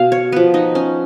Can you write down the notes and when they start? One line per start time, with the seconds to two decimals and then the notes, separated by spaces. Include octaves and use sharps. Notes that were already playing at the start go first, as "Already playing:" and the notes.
Already playing: B2 F5
0.12 C#5
0.32 F3 B3 B4
0.54 D#4
0.75 C#4